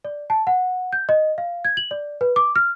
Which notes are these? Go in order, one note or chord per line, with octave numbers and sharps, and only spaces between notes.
D5
A5
F#5
G6
D#5
F5
G#6
F#7
D5
B4
D6
F6